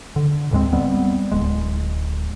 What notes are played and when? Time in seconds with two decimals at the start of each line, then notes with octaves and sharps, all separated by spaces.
0.16 D3
0.51 A1 D#2 G#3 C4
0.73 G3 B3 C4
1.31 D1 G#3